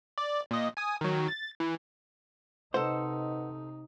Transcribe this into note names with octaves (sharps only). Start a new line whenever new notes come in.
D5
A#2 D#5
G#5 D#6
D#3 F#3
A6
E3
C3 D#4 A4 B4 C5 D#5 F#5